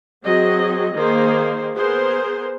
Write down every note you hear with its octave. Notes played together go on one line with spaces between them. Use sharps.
F#3 C4 G#4 D#5
D#3 A#3 G#4 C5
B3 G#4 A#4 C5